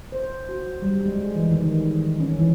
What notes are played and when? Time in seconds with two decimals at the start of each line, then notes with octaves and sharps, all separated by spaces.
0.12 C5
0.49 F#4
0.82 G3
1.06 G#3
1.35 E3
1.51 D#3
2.20 C#4
2.39 E3